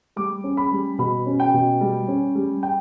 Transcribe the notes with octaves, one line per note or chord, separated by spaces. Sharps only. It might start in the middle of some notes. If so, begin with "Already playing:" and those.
G3 D6
C#4
B5
G3
B2 B5
C#4
G5
B2
G3
C#4
G3
G5